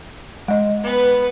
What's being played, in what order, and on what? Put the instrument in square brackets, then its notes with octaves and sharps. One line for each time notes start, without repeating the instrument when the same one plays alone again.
[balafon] G#3 D#5
[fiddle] B3 B4